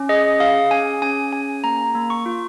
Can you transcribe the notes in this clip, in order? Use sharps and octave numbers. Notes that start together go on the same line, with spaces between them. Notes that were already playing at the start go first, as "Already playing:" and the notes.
Already playing: C#4
G#4 D#5
G#4 F5
C#4 G#5
C#4 G#5
G#4 G#5
A#3 A#5
A#3
C#6
F4